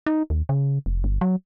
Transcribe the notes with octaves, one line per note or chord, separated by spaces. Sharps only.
D#4
D#2
C#3
F1
G1
F#3